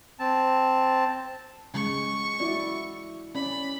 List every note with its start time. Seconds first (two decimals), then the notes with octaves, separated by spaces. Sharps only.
0.19 C4 A5
1.74 C#3 G#3 C#6
2.40 E4 F#4 D5
3.35 C#4 D5 B5